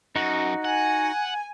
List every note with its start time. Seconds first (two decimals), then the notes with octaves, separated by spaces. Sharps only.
0.16 F#2 D#4 F#4
0.65 F#5 G#5